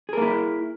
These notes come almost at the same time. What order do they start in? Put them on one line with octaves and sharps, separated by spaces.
G#4 A#4 A#3 E4